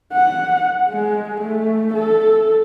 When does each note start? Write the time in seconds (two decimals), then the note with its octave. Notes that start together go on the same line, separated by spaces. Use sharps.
0.13 F#5
0.90 G#3
1.41 A3
1.94 A4